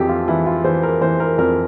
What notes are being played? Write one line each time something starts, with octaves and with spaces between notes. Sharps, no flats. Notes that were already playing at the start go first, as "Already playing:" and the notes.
Already playing: F2 E3 G4 A4
F4
E3 E4
F4
E3 C5
A#4
E3 C5
A#4
F2 A#4